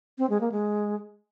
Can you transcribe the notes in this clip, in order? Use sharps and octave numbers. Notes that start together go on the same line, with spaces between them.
C4
G#3
A#3
G#3